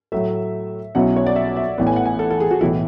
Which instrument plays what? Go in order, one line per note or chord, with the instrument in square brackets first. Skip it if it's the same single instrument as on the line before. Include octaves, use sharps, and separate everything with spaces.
[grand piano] A2 F#3 A3 [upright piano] E5
[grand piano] B1 B2 F#3 C#4 E4 [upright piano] F#5
[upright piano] C#5
D5
E5
E5
[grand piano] A1 A2 E3 B3
[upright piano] G#5
F#5
G#5
A4
A4
G#4
F#4
[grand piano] B1 A2 E3 [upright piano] E4